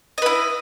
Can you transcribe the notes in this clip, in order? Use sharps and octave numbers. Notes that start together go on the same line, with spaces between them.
E4 B4 D#5